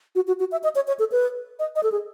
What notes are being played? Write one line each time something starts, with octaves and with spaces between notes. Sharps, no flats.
F#4
F#4
F#4
E5
D#5
C#5
C#5
A4
B4
D#5
D#5
A4
G#4